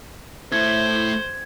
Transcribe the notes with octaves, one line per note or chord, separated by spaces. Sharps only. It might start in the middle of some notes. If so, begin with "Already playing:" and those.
A3 E4 C5 G#6